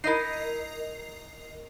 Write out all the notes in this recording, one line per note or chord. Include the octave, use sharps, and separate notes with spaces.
D#4 E4 A#4 D#5 C7